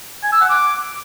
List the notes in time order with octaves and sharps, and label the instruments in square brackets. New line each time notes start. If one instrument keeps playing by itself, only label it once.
[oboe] G#5
E6
F#5
D6